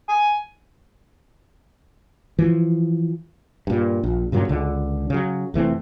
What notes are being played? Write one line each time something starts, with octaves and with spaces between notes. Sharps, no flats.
G#5
E3 F3
G2 A#2
A#1
G2 A#2 C#3 F#3
C#2 D3
C#3 F#3
F1 E3 A3 C4